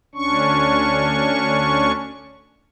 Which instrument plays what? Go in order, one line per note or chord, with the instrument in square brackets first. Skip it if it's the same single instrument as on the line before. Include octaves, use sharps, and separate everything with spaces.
[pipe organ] D2 C#4 D4 C#6